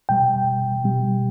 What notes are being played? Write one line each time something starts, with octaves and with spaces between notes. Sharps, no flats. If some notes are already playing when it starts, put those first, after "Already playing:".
B2 G3 G5
B2 G3